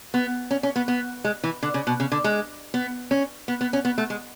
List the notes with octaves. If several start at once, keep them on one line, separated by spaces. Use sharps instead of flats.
B3
C#4
C#4
B3
B3
G#3
E3
D3
C#3
B2
C#3
D3
G#3
B3
C#4
B3
B3
C#4
B3
A3
G#3